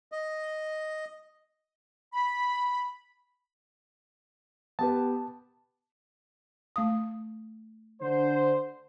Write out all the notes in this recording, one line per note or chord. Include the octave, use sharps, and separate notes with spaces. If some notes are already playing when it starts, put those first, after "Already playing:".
D#5
B5
B3 G4 B4 A5
A3 F5 D#6
D3 C5